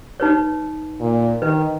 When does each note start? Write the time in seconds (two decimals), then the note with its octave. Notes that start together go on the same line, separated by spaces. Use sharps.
0.20 D#4 B4 C#5
1.01 A#2
1.42 D#3 B4